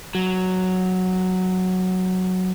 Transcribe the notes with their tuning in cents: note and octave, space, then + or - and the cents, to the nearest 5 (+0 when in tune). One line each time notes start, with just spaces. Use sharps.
F#3 +0